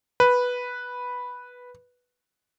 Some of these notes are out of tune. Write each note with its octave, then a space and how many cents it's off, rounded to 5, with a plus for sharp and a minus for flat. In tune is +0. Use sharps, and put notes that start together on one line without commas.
B4 -5